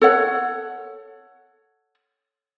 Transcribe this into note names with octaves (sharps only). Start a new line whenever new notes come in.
A4 C#5 F#5